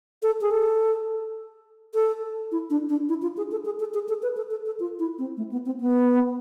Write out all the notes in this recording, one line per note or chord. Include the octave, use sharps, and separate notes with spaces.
A4
G#4
A4
A4
E4
D4
D4
E4
F4
G#4
A4
G#4
A4
G#4
A4
B4
A4
A4
A4
F4
E4
C4
A3
B3
C4
B3